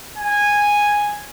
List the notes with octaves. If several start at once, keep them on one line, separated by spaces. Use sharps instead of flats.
G#5